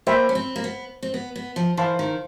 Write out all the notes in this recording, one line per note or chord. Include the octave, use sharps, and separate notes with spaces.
A#3 C5 E5 G5 B5
C#4
C4
A#3
B3
C4
B3
B3
F3
E3 C5 F5 A5 C6
D#3